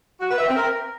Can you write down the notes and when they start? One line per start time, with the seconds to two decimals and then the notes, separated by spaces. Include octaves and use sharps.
0.20 F#4
0.29 B4
0.38 E5
0.47 C4
0.56 A#4